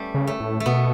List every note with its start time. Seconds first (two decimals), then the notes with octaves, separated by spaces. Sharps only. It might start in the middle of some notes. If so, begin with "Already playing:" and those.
Already playing: G3 A3 B3 C#4
0.14 C#3
0.27 A3
0.40 A2
0.60 A3
0.66 B2 B3